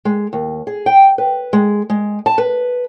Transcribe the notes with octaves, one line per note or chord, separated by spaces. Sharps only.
G#3
D#2
G#4
G5
B4
G#3
G#3
A5
B4